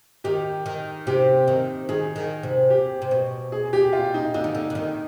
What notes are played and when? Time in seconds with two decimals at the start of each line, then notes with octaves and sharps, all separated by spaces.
0.24 D#3 G4
0.66 D#3
1.07 C3 G4
1.48 D#3
1.89 D#3 G#4
2.16 D#3
2.43 C3
2.70 G4
3.02 C3
3.11 B2
3.52 G#4
3.73 G4
3.93 F4
4.14 D#4
4.34 D3 D#4
4.44 D#3
4.55 D3
4.70 D3
4.75 D#3